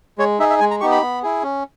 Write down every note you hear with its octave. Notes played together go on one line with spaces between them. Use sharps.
G#3 C#5
D#4 G#4 E5
E5
G#3 G#5
A#5
B3 D#4 G4 C#6
B5
B3
E4 G#4
C#4